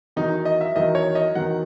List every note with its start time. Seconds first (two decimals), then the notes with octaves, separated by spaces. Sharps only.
0.16 E2 D#3 F#3 D#4
0.45 D#5
0.61 E5
0.76 E2 D#3 F#3 D#5
0.95 C#5
1.15 D#5
1.35 E2 D#3 F#3 F#5